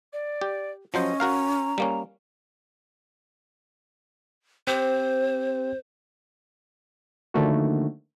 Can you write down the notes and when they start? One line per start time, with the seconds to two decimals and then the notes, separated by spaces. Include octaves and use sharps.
0.13 D5
0.41 G4
0.94 F3 F#3 C#4 C5 D#5
1.20 F#4 A#4 F5 A#5
1.78 G3 A#3 C#4
4.67 C4 G4 C5
7.34 D3 D#3 F3 A3 A#3 F#4